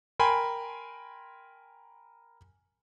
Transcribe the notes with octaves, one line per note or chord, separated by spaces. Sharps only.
A#4 G5 G#5 B5 C6